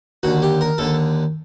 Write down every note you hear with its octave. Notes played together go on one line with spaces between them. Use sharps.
D#2 D3 F#4
G4
A#4
D#2 D3 A4